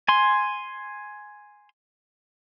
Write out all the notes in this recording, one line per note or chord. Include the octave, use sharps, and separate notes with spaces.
G#5 C6